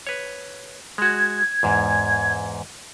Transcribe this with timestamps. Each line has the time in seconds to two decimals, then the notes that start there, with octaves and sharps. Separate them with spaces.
0.07 B4 C#5
0.98 G#3 F#4 G#6
1.63 E2 G#2